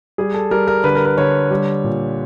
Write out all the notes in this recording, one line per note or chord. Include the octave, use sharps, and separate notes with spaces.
G3 G#4
A4
G3 A#4
A#4
D3 B4
A#4
B4
D3 C#5
G3
A#2